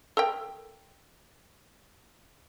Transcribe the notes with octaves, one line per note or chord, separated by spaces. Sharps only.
A4 A#4 G5